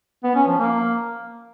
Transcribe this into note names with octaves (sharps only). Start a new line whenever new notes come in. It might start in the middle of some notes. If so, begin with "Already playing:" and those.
B3
C#4
F3
A#3